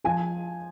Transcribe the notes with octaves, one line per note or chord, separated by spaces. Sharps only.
F3 G#5